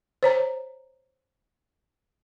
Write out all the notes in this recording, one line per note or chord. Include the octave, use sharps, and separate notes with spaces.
C5 C#5 A#5